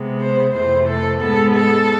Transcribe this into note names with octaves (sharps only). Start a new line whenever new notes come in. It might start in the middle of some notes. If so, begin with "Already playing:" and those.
Already playing: C3 G#3 B3
C5
F2 C3 E3 A3 C5
A4
G#2 G#3 B3 A4
A4